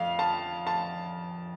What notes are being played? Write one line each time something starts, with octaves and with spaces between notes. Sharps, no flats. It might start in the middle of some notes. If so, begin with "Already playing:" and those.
Already playing: F2 F5
A5
A5